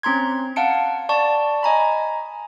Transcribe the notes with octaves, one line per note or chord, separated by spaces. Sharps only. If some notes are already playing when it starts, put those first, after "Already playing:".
C4 C#4 A#5 C6 G#6
F5 F#5 A5 C#7 D7
D5 A5 C#6
D#5 G#5 A#5 B5